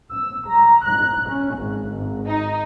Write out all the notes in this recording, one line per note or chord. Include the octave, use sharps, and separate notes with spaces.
E6
A#5
F#6
C#4
G#1
G#1
D#4